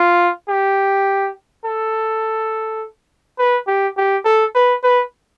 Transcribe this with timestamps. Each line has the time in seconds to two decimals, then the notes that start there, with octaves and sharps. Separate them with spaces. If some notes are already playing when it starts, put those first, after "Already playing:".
Already playing: F4
0.49 G4
1.64 A4
3.38 B4
3.67 G4
3.97 G4
4.25 A4
4.55 B4
4.83 B4